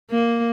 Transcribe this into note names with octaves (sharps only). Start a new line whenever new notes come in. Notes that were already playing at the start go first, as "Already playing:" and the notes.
A#3